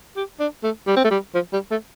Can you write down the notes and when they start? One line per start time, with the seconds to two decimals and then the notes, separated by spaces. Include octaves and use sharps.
0.16 G4
0.40 D4
0.63 A3
0.87 G3
0.96 C4
1.04 A3
1.11 G3
1.34 F3
1.53 G3
1.71 A3